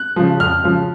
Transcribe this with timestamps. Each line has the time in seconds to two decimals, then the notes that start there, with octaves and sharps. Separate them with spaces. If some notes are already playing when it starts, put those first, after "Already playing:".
Already playing: F#6
0.16 C#3 F3
0.40 F2 F6
0.64 C#3 F3